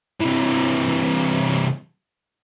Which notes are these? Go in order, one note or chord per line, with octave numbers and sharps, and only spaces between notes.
C3 E3